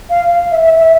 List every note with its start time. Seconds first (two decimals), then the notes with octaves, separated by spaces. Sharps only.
0.10 F5
0.52 E5
0.65 E5
0.79 E5